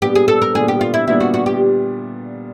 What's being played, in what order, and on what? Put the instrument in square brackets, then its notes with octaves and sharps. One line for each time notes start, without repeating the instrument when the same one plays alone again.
[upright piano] A#2 G3 B3 D4 [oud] G4
[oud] G#4
A4
A#4
[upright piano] A#2 G3 B3 D4 [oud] G#4
[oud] G4
F4
E4
[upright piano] A#2 G3 B3 D4 [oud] E4
[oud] F#4
F#4
G4